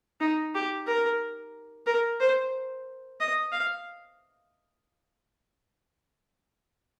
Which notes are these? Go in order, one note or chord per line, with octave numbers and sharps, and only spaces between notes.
D#4
G4
A#4
A#4
C5
D#5
F5